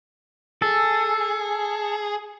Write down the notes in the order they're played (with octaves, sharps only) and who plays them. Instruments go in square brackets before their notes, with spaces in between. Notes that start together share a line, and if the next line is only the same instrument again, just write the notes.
[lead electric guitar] G#4 [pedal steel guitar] A4